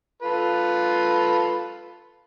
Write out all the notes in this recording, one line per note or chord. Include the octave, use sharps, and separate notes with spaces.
F4 A4 B4